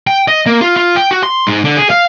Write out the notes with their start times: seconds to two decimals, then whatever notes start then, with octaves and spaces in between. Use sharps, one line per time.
0.07 G5
0.28 D#5
0.46 A#3
0.61 F4
0.76 F4
0.96 G5
1.11 F#4
1.23 C6
1.47 G#2
1.64 D3
1.77 G#4
1.90 F5